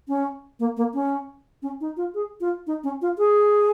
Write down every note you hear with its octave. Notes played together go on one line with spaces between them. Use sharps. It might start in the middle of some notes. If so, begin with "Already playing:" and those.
C#4
A#3
A#3
C#4
C#4
D#4
F4
G#4
F4
D#4
C#4
F4
G#4